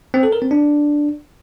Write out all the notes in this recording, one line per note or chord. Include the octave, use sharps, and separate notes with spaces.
C4
A4
A#4
C4
D4